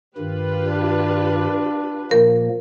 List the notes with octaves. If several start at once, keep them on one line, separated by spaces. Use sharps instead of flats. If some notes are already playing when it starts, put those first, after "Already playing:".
G2 D#3 F4 G4 B4
D4
A#2 F3 A#3 A#4